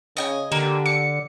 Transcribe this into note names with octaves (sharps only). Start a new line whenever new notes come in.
C#3 D#5 G5 G#5
D3 A#3 G4
D6 C#7